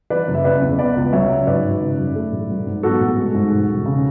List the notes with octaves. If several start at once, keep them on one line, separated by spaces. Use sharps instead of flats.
E3 B4 D5
F#1
E5
C#3 B4 D5
E2
B3 B4 D5
C#2
F#3 C#5 E5
C#3
G#1 B4 D5
G#1
C#3
F#2
A3
A1
F#3
G#2
B3 F#4 A4
A1
G#3
G#2
E1
E1
C#3